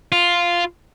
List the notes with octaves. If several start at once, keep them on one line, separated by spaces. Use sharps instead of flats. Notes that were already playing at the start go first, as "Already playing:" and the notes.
F4